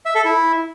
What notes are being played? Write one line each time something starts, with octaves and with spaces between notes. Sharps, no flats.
E5
A4
E4